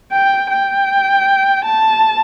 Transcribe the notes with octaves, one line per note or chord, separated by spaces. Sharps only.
G5
G5
A5